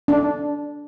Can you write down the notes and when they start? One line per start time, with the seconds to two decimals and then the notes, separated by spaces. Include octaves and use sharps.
0.08 D4